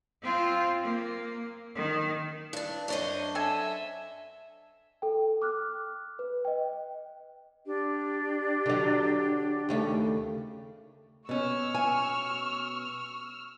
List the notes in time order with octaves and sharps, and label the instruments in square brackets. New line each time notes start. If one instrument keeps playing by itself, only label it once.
[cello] C4 F4
A#3
D#3
[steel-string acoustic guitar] G2 D4
[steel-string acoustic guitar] F#2 D4 C5 [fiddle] C#5 D#5
[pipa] A4 G#5 [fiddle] D#5 E5
[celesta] A4 G5
D6 F6 F#6
B4
D#5 G5
[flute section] D4 G4
[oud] D3 F#3
D#2 C#3 A3
[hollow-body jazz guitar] B2 C#4 [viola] C#6 [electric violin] E6 F6
[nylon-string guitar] G#5